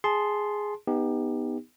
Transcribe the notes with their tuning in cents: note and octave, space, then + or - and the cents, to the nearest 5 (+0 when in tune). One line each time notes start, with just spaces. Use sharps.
G#4 +0 A5 -15 C6 +0
B3 +0 D#4 +0 G4 +25